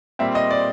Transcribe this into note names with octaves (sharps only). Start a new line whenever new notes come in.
A#2 G3 C4 E5
D#5
D5